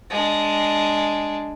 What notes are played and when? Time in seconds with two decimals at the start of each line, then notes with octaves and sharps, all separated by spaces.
0.10 G#3 D4